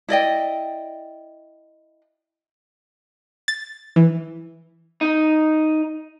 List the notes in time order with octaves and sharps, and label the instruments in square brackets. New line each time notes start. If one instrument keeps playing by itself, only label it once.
[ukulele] E4 D5 D#5 G5
[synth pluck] A6
E3
[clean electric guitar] D#4